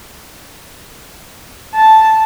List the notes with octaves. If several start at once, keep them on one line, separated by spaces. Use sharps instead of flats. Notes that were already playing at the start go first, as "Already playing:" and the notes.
A5